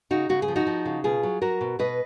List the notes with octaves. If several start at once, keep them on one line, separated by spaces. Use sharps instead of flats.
C#3 D#4 F#4
C#3 F#4
G#4
F3
D#4 F#4
F3
C#3
B2 F4 G#4
F#3
F#3 F#4 A#4
B2
B2 B4 D#5